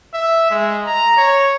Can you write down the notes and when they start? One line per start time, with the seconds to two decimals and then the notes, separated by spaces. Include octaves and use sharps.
0.14 E5
0.51 G#3
0.86 A#5
1.17 C#5